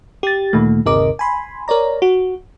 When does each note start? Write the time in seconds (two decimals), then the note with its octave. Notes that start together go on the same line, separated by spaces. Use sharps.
0.23 G4 A6
0.53 D2 A#2 D#3 A3
0.86 G1 D#2 C3 A#4 D#5 D6
1.19 G#5 B5 C6
1.68 A#4 C#5 D5 A#5
2.02 F#4